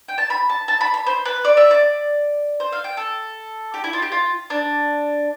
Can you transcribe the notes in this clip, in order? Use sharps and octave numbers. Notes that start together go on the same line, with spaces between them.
G5
A5
B5
A5
A5
B5
B5
C5
B4
D5
E5
D5
C5
F5
G5
A4
G4
E4
F4
G4
F4
D4